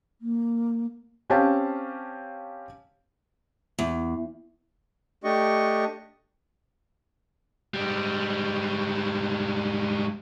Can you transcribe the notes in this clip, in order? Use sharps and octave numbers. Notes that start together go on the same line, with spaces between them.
A#3
C4 C#4 G4 F5 A5
E2
A3 D4 G4 D#5 C#6
G#2 G3